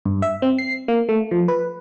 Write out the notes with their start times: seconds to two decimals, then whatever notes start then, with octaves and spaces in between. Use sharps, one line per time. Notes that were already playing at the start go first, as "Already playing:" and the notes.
0.05 G2
0.22 E5
0.42 C4
0.59 C7
0.88 A#3
1.09 A3
1.31 F3
1.48 B4